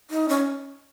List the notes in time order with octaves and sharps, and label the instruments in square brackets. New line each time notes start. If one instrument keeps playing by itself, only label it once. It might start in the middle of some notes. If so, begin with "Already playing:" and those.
[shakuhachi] D#4
C#4